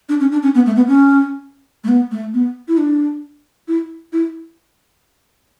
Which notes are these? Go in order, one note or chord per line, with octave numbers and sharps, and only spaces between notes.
D4
C#4
D4
C#4
B3
A3
B3
C#4
A3
B3
A3
B3
E4
D4
E4
E4